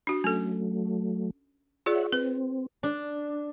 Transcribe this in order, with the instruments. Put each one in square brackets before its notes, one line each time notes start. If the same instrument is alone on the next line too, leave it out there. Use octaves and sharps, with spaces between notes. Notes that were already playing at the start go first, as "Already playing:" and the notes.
[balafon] D4 F#4
[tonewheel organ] F#3 A3 [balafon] C#4 A4
[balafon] F4 G#4 D5 [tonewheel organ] C#5 E5 F#5
[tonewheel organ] C4 [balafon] B4
[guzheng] D4